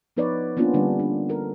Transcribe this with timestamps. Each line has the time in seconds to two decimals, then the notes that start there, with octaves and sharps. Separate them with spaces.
0.17 F3 B3 D#4 B4 C#5 D5
0.57 A#3 B3 C#4 D4 F4
0.74 D3 G3 D4
0.99 D4
1.29 A4 A#4